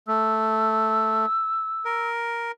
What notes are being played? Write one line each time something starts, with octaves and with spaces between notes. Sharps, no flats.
A3 E6
A#4